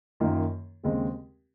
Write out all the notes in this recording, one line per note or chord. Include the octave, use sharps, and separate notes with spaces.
F#2 D#3 A#3 F4
D#2 C#3 G#3 C4